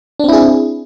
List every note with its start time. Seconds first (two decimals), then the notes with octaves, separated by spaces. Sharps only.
0.19 D4
0.24 C4
0.28 E4
0.33 G#4